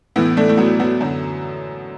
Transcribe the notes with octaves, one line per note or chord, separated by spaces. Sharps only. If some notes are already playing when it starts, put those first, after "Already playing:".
A2 E3 B3 E4
A3 D4
A3
F#3 B3
F#3 B3
F#2 D3